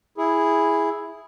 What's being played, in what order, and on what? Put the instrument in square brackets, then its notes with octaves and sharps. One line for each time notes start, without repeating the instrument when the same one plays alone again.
[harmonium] E4 G#4